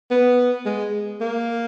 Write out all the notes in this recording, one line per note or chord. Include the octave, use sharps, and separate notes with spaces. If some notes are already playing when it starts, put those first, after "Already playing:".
B3
G#3
A#3